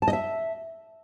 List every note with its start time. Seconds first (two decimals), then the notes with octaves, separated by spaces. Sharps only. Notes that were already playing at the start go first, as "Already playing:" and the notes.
0.02 A5
0.08 D#5
0.13 E5